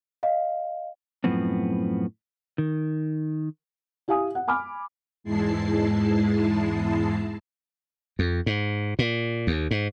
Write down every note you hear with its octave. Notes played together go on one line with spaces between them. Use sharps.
D#5 F5
F#2 A2 F3 B3 C4
D#3
E4 G4 F5 G#5 D#6
F#5
G#5 B5 D6 F6
E2 G#2 G#3 E4 A5 C7
F2
G#2
A#2
D#2
G#2